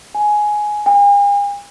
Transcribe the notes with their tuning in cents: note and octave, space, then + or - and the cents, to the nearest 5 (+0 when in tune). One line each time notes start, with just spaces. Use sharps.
G#5 +10
G#5 -45